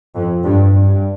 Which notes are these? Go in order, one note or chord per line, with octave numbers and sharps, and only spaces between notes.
F2
G2
G2